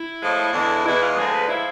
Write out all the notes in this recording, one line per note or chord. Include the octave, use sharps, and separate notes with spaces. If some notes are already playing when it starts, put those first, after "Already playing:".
Already playing: E4
A2 F3 G#3
E2 D3 G#3
E2 B2 G#3 E4
F4
D2 D3 F3 G#3 G#4
B4
F3 G#3 E4